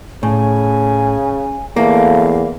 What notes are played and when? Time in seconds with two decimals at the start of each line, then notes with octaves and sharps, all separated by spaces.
0.23 A2 C#3 G#5
1.76 E2 A3 A#3 F5